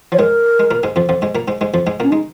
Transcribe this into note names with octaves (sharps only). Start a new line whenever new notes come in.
F3 C#5
G#2 G#3 A#4
G#3
A#2 A#3
G#2 G#3
F2 F3
F2 F3
G#2 G#3
A#2 A#3
G#2 G#3
G#2 G#3
F2 F3
G#2 G#3
A#2 A#3 C#4
G#3 D#4